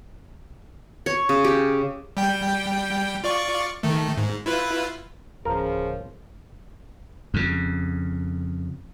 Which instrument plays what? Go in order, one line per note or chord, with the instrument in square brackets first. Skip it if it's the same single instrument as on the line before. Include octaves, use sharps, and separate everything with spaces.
[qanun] C#5
C#3
G4
[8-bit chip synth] G3 G5
F4 D5 C#6
D#3 A3
G#2
E4 F4 B4
[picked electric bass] D1 [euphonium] C#3 [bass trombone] F3 [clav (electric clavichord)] A#4
[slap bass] F2 C#3